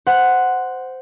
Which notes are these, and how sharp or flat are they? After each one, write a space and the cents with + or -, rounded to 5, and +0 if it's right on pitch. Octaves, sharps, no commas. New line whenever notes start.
C5 -10 F#5 +0